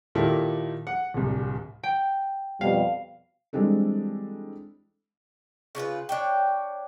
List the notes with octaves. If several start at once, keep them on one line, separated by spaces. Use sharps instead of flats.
A#2 D#3 E4 G4 A4
F#5
D1 C2
G5
F2 B2 G3 F5
E3 G3 G#3 C4 D4 A4
C#3 D4 F4 B4
D4 C#5 G5